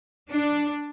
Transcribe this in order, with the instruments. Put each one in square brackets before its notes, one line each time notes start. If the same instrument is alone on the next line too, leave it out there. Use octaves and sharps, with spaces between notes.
[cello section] D4